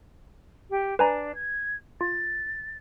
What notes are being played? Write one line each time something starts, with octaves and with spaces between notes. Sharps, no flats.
G4
D4 B4 G#5 A#5
G#6
F4 A6